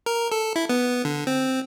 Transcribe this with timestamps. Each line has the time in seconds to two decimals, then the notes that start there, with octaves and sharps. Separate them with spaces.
0.06 A#4
0.32 A4
0.56 E4
0.69 B3
1.05 D3
1.27 C4